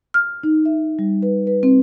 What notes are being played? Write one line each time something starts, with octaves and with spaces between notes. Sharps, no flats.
F6
D#4
E5
G3
B4
B4
C4